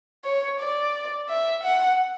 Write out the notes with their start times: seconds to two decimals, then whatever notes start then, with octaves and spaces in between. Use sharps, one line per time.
0.24 C#5
0.60 D5
1.29 E5
1.63 F#5